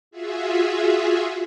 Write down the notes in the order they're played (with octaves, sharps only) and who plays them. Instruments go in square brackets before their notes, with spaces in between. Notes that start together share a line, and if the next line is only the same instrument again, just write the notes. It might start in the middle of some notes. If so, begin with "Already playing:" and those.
[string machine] F4 F#4 G#4 E5